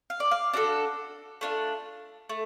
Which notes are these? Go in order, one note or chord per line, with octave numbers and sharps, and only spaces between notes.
F5
D5
F5
D4 F#4 A4 D5
A3 D4 F4
A3